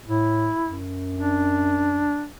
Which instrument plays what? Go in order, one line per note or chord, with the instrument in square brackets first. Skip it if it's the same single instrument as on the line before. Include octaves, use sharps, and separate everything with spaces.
[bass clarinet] A2 [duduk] E4
[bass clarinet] F#2
[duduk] D4